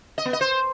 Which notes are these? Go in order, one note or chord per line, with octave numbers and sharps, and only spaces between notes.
D#5
B3
D#5
C5